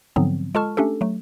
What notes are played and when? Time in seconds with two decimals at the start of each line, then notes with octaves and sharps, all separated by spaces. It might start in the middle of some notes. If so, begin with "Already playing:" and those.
0.16 G#2 D3 F3 F#3 B3 C4
0.55 G#3 F4 A4 A5 C#6 F6
0.77 A3 C#4 D4 G4 A4
1.01 F#3 A3